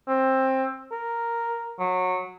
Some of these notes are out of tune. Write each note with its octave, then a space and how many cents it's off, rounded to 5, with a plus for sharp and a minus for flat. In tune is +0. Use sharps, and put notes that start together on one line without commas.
C4 +15
A#4 +0
F#3 -20